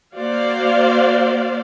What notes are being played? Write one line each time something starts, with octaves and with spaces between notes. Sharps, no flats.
A#3 F#4 C5 D5 F5